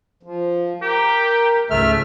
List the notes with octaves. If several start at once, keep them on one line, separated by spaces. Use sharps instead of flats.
F3
G4 A#4
C#2 G#2 A3 E5 F6